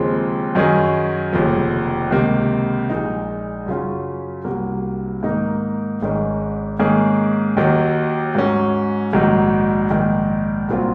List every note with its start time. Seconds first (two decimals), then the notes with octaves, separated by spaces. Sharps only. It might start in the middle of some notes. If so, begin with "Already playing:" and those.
Already playing: D#2 C#3 F3 G#3 C4
0.55 F#2 D#3 F#3 C#4 G#4
1.33 F1 D#2 C#3 F3
2.10 C#2 C3 D#3 A#3
2.89 A#1 A#2 G#3 D#4
3.66 F#2 C#3 F#3 C#4 F4
4.44 C2 C3 F#3 A#3
5.23 G#2 D#3 A#3 D#4 A#4
6.01 G#1 G#2 D#3 G#3 C#4
6.79 G#2 D#3 A#3 C#4 G#4
7.57 D#2 D#3 F#3
8.35 G#2 F#3 C#4
9.13 A#1 G#2 D#3 F#3
9.90 A#1 G#2 D#3
10.68 C2 A#2 F#3 C4 F4